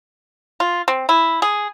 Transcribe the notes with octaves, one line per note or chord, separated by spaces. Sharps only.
F4
C4
E4
G#4